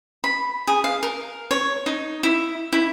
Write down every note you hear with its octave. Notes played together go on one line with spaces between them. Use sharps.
B5
G#4
F5
A#4
C#5
D#4
E4
E4